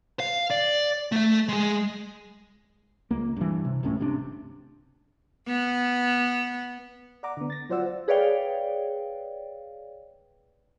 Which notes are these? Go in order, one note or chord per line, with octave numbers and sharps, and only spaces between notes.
F5
D5
A3 E5
G#3 G#4
C#2 A#3
G2 E3
C3
D1 C#2 A2 C#4
G1 C3 D4
B3
D5 F#5 A#5 D6
D3 B3
A6 A#6
F#3 F4 C5 D5 F#5 E6
G#4 B4 C#5 D5 F5 G5